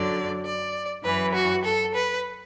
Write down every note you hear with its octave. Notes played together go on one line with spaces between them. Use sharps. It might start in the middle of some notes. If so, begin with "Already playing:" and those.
Already playing: F#2 D3 F#3 D5
D5
F#2 E3 B4
F#4
A4
B4